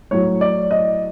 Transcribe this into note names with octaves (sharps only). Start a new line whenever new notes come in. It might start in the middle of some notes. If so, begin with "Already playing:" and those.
A2 F#3 C#5
D5
D#5